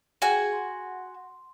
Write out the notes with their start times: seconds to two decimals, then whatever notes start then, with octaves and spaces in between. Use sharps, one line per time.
0.22 F#4 G#4 F#5 G#5
0.52 C6